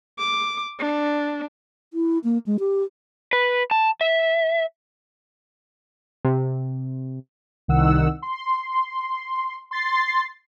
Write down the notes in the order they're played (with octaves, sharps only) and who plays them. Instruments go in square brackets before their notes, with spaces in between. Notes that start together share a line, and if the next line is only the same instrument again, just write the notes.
[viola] D6
D4
[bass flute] E4
A#3
G#3
G4
[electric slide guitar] B4
A5
E5
[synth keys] C3
[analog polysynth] C2 D#3 F#5 E6
C6
C6 A6 C7